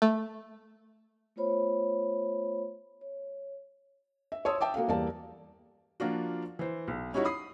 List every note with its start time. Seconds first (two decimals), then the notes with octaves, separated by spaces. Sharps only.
0.02 A3
1.36 A3 B3 F4 C5 C#5 B5
3.01 C#5
4.32 E5
4.45 C#5 A5 C6 D#6 E6
4.61 E5 G5 A5 D6
4.74 A#3 F#4 A4 F5
4.88 E2 G3 A#3 G4 D5 A5
6.00 F3 A#3 D4 F4 F#4
6.59 E3 C5
6.88 B1
7.13 G3 C#4 D#4 E4 F#4 C#5
7.25 B5 D#6 C7